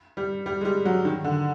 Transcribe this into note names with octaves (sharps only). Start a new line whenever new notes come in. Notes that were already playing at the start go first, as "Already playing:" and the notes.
G3
G3
G#3
G3
F#3
D#3
D3